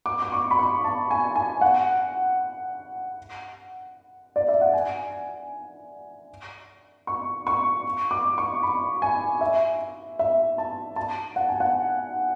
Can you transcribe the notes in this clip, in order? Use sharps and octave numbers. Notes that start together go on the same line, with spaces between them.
D6
D6
C#6
B5
C#6
A5
G#5
G#5
F#5
D5
E5
F#5
G#5
C#6
C#6
D6
C#6
B5
G#5
E5
E5
A5
A5
F#5
G#5
F#5